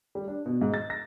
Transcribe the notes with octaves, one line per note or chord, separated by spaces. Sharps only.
G3
D4
B2
G#2
A6
A#6